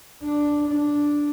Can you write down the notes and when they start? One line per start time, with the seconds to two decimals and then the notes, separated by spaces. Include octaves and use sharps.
0.23 D4
0.68 D4